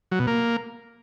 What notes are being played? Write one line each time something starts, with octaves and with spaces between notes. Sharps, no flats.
F#3
B2
A#3